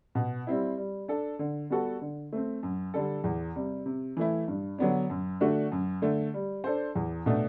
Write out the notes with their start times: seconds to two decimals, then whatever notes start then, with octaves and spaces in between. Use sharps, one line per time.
0.15 B2
0.47 G3 C4 E4
0.78 G3
1.08 D4 A4
1.39 D3
1.70 G3 B3 F#4 A4
2.02 D3
2.32 A3 C4
2.63 F#2
2.94 D3 G3 D4 A4
3.24 E2
3.56 C3 G3
3.86 C3
4.17 E3 A3 E4
4.48 G2
4.78 D3 F#3 B3 D4
5.10 F#2
5.40 D3 A3 D4 F#4
5.72 F#2
6.02 D3 A3
6.34 G3
6.64 D4 A4 C5
6.95 E2
7.26 B2 A3 D4